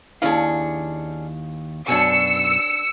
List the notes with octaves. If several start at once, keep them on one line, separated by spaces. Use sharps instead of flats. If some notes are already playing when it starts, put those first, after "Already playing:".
D#2 C#4 D4 E4 G#4 F5
F#2 B2 D4 C#5 G#5 E6 C#7